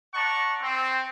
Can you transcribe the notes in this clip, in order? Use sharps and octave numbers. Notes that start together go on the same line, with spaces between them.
D5 F#5 A5 A#5 C#6
C4